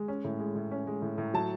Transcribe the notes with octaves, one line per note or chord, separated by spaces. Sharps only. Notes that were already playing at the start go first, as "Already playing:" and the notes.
Already playing: G#3
C#4
A2
G#3
A2
C#4
G#3
A2
A2
F#3 A5